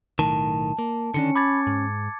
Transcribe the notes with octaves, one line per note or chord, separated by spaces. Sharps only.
B1 A2 D#3 A5
A#3
D3 D#3 C#4 D4 C#7
B5 D6 G#6 A6
G#2